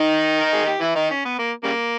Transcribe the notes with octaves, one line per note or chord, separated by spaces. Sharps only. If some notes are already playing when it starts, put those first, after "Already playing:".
Already playing: D#3 D#4
A#4
G#4
G4
E3 E4
D#3 D#4
C#4
B3
A#3
C#3 G3 A#3